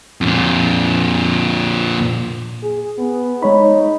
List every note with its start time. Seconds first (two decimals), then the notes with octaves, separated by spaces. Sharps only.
0.21 F2 A#2
2.63 G#4
2.98 B3
3.43 G#3 D#4 C#5 B5